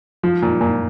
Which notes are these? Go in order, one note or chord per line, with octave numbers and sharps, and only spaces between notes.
F3
A#2
A#2